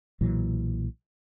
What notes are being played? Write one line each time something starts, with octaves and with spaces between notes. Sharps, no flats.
B1 A#2 E3 F#3